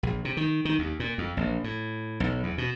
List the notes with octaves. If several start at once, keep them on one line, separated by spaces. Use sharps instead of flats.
A#1
C3
D#3
D#3
D#2
A#2
F2
A#1
A2
B1
E2
B2